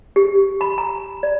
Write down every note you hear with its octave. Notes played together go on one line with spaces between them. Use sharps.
G4
B5
A#5
D5